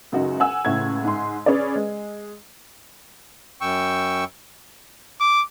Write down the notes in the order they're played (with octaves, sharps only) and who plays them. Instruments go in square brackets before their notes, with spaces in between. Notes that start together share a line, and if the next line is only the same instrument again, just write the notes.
[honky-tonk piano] C#2 F#2 D#4 F#4 D#5
F#5 G#5 E6
C#2 A2 F#5 G#6
G#2 C6
C#4 G#4 B4 D5
G#3
[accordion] F#2 G5 C#6 E6
[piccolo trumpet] D6